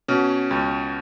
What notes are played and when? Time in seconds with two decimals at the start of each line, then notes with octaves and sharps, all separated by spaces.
0.08 B2 C#4
0.51 C#2